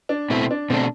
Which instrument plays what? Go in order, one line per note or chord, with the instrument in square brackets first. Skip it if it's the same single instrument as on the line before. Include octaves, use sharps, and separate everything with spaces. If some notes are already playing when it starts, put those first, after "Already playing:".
[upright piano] D4
[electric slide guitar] B2 A3 E4 [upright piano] C4
[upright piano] D4
[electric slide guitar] B2 A3 D4 [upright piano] C4